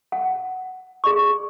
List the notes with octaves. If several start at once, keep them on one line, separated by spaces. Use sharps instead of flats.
F#5
G#4 D5 C#6